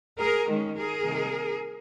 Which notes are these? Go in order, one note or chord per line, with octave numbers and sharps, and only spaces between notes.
G#4 A#4
D#3 G#3 C#4
G#4 A#4
C3 D#3 G3 A#3 D#4